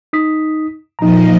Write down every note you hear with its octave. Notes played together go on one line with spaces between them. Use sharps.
D#4 D#6 B6
A#2 F3 D#4 D#5 A#5